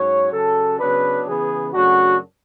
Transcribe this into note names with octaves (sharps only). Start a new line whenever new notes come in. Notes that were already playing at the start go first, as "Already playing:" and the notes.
Already playing: G#2 F#3 C#4 C#5
C#3 F#3 C#4 A4
C#3 F#3 B3 D4 B4
C#3 E3 B3 G#4
F#2 C#3 F#3 A3 D4 F#4